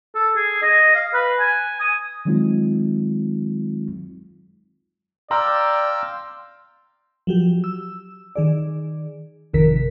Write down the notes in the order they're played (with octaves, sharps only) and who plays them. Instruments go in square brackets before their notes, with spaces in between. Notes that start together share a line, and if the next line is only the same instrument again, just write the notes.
[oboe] A4
G#4
D#5
F5
B4
G#5
D#6
[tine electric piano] D#3 F#3 G#3 C4 D#4 F4
[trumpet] D5 [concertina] F5 G5 E6 [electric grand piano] A#5 [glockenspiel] C6
[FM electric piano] F3 F#3 G4
E6
D#3 G#4 D5
G#1 F2 C3 D#3 A#4 B6